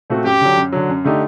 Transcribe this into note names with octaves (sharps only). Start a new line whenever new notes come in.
A#2 A3 C4 F#4
F#2 G4
D3 F#3
F#2
D3 F#3
F#2
D3 A3 D#4 G4